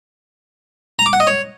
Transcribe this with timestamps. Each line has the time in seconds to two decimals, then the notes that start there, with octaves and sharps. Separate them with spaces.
0.99 A#5
1.06 D6
1.13 F#5
1.20 D#5
1.27 C#5